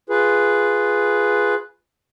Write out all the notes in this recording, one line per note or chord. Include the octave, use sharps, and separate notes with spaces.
F4 G#4 B4